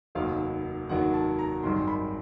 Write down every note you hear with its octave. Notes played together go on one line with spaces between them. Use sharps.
F1 D#2 D#3 F#3 F5
F1 D#2 D#3 F#3 F#5
A5
A#5
G#1 F#2 D#3 G3 C6
B5